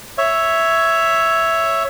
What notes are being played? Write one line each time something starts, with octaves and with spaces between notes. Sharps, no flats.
C#5 E5